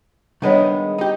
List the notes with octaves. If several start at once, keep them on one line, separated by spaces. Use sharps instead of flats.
D#3 G3 G#3 B3 D4 C#5
D#4 G4